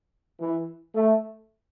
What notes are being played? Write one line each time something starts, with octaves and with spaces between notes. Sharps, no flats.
E3
A3